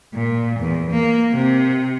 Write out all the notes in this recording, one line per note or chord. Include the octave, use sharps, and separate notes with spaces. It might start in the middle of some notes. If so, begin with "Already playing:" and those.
A#2
E2
A#3
C3